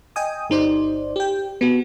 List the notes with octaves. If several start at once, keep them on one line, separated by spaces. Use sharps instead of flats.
D#5 G5 G#5 D#6
G1 D#4 C5 D5
G4 G5
B3 F#4